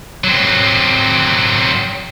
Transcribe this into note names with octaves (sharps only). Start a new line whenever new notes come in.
F#3 C4